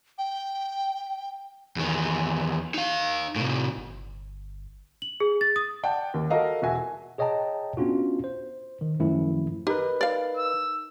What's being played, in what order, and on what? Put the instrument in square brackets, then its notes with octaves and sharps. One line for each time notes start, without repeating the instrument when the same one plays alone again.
[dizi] G5
[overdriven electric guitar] E2 D#3
D#4 F5
A2 C3
[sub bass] G1
[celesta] F#7
G#4
A6
D#6
[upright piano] D5 F#5 G5 A5
D#2
F#4 A4 A#4 D#5 F5
E1 F#4 E5 G#5
[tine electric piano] G#4 C#5 D#5 G5 A5 A#5
B3 C#4 D4 F4 F#4
C5
D#3
F#2 D#3 F3 A3 E4
[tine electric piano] D#4 A#4 B4 [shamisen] G4
[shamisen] D5 F5
[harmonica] E6